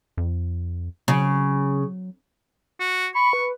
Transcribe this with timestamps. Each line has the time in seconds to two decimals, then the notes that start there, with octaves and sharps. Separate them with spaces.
0.17 F2
1.08 C#3 F#3
2.80 F#4
3.15 B5 C#6
3.33 B4